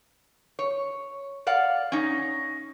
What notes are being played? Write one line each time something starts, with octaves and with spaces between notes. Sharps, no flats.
C#5
D5 F5 F#5
C#4 D#4